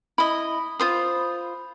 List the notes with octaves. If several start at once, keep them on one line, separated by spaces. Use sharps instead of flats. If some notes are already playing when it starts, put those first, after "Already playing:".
E4 D#5 B5
F4 C5 D#6